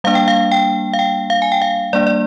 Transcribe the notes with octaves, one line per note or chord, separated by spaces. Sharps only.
G3 A#3 D4 F5
G5
F5
G5
F5
G5
F5
G#5
G5
F5
G3 A#3 D4 D5
D5